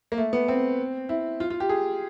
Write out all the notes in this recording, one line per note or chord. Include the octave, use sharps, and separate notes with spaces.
A#3
A3
B3
C4
E4
F4
F4
G4
G#4